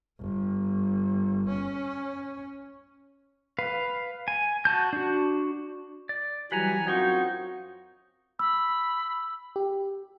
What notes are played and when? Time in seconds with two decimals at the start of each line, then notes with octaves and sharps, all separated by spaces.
0.19 G1
1.49 C#4
3.59 B4 F5
4.28 G#5
4.65 F#4 A5 G6
4.93 D4 F#4
6.09 D5
6.52 E3 F#3 G3 B4 F#5 G#5 A#5
6.87 F#2 C4 D#4 F4 F#4 C#5 G5 C#6
8.39 B5 E6
9.56 G4